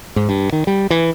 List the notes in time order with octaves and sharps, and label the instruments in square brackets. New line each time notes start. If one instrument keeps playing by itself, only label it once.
[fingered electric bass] G#2
G2
D#3
G3
E3